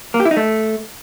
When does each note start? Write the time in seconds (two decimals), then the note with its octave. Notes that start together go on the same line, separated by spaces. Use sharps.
0.14 A#3
0.20 G4
0.25 E4
0.31 D#4
0.37 A3